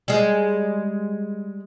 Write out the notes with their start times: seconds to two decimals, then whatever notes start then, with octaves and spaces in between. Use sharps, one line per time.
0.08 G3 G#3